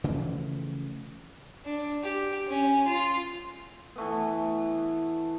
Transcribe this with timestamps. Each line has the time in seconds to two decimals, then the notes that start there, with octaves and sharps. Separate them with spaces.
0.04 C#3 E3 F3 A3
1.65 D4
2.03 G4
2.48 C#4
2.87 F4
3.96 E3 A3 B3